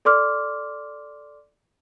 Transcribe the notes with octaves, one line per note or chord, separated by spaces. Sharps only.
A4 D5 C6 D6 F6